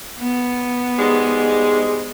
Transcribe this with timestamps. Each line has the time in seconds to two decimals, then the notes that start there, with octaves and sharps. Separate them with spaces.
0.19 B3
0.97 G#2 G3 G#3